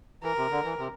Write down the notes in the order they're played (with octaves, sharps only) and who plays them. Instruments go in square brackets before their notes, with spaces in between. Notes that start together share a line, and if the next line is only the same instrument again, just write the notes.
[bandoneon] E3 [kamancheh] A#4
[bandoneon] C3
D3
E3
C3